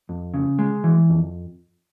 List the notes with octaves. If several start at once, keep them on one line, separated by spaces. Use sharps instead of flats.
F2
C#3
G#3
E3
F2